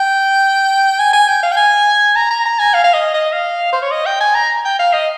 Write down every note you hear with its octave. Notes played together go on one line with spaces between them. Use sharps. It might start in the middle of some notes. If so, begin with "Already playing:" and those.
Already playing: G5
G#5
G#5
G5
F5
G5
G#5
A#5
A#5
A#5
G#5
F5
F5
D#5
D#5
F5
C5
C#5
D#5
G5
G#5
A#5
G5
F5
D#5